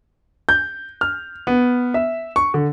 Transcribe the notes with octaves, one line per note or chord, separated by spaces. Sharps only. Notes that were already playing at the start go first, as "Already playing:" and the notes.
G6
F6
B3
E5
C#6
D3